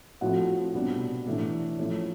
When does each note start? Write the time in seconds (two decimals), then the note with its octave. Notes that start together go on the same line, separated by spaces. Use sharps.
0.21 A2 F3 A3 C4 F#4 F#5
0.74 C2 B2 G3 B3 D4
1.26 A2 E3 A3 D4
1.79 A2 F3 A3 C#4